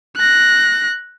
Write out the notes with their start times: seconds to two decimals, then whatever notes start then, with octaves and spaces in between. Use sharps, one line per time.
0.17 F#6 A#6